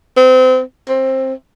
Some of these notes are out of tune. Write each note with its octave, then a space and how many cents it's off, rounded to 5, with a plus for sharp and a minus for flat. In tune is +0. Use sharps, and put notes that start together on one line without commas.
C4 -30
C4 +15